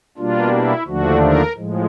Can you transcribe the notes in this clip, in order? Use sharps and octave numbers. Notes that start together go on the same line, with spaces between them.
B2 G3 A#3 D4 F4
E4
D#2 D3 F3 A3 D4 F#4
A#4
A2 F3 G#3